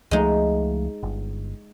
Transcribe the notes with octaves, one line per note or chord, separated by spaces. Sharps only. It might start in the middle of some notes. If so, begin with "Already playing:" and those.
C#2 F3 G#3 A3 D#4
G1